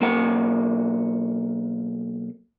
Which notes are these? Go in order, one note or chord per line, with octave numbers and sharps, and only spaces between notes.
B1 A#3 A#4 F#5